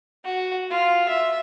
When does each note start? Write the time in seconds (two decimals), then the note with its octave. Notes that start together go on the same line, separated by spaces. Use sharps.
0.24 F#4
0.70 F4
1.08 E5